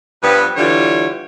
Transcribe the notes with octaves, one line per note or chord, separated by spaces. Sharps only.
G2 F3 B3 B4
D3 E3 G3 F4 C#5